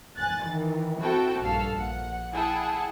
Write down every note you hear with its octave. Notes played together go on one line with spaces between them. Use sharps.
G#5 F#6 A6
D#3 E3
C4 E4 F#4 A4 G5 A5
A#1 G2 A4 F5
A#1 F#5
E4 G#4 F#5 G5 A5